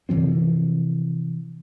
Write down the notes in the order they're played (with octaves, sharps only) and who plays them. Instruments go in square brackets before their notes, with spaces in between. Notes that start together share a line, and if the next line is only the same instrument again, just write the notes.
[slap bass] C3 E3 F3 C4